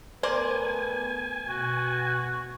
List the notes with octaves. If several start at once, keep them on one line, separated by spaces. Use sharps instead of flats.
A3 B3 A#4 C5 D5 G#5
B2 F#4